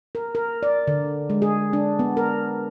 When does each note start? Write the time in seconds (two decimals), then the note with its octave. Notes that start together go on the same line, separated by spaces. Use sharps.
0.15 A#4
0.35 A#4
0.63 D5
0.87 D3
1.30 G#3
1.42 G#4
1.73 D4
1.99 B3
2.17 A#4